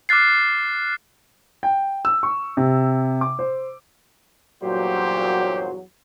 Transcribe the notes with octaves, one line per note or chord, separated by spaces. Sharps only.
D6 F6 F#6 A6 C7
G5
E6
C#6
C3
D6
C5
E2 G2 A#2 F#3 F#4 G4 C5